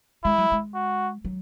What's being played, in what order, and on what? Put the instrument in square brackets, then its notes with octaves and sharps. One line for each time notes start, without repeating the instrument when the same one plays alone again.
[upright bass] G#3 [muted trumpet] E4
[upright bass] F#3
G#3
[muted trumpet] F#4
[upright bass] F#3